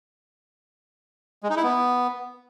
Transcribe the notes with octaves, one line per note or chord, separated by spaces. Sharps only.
G#3
D#4
E4
B3